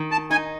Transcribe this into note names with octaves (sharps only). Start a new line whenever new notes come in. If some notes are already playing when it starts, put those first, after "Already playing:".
Already playing: D#3
A5
D#4 G#5